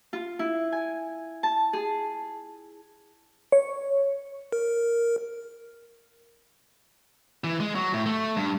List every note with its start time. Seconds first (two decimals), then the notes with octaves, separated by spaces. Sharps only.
0.13 F4
0.39 E4
0.72 G#5
1.43 A5
1.73 G#4
3.52 C#5
4.52 A#4
7.44 E3
7.60 G#3
7.75 F#3
7.94 A2
8.06 A3
8.37 G2